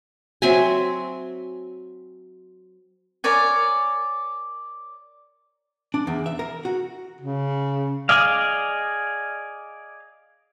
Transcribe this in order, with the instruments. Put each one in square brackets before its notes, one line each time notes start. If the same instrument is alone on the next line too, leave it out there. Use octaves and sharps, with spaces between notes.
[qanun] F#3 C4 E5 G#5
[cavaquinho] A#4 C#5 D5 G#5
[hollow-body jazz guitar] D4
E2
E5
A#4
F#4
[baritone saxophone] C#3
[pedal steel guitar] G#4 D5 D#5 F5